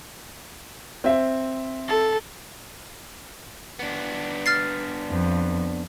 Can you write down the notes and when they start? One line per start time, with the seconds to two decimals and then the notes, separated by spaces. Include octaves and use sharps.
1.04 C4 E5
1.88 A4
3.79 B3 D4
4.46 F6 A6 C7
5.09 F2